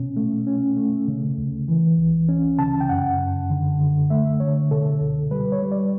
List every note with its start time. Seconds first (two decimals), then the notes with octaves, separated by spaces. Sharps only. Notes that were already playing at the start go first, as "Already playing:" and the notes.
Already playing: B2 C#4
0.17 A3
0.47 C#4
0.77 A3
1.08 C#3
1.38 D2
1.68 E3
1.98 C#2
2.29 C#4
2.59 C#3 A5
2.81 G5
2.89 F#2 F#5
3.19 F#2
3.50 D3
3.80 D3
4.10 A3 E5
4.40 D3 C#5
4.71 B2 A4
5.01 C#2
5.31 G3 B4
5.52 C#5
5.62 G3
5.72 D5